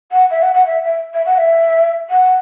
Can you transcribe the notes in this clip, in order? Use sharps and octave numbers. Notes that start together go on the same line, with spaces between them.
F#5
E5
F#5
F#5
E5
E5
E5
F#5
E5
F#5